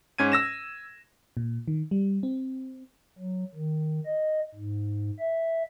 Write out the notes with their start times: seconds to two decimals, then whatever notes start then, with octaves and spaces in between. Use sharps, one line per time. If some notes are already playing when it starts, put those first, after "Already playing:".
0.18 G#2 C#4 G#6 D#7
0.32 E6 A#6 E7
1.37 A#2
1.68 D#3
1.91 G3
2.23 C4
3.19 F#3
3.55 D#3
4.06 D#5
4.55 G#2
5.19 E5